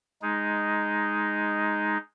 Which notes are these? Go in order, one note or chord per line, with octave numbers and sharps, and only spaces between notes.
G#3 D#4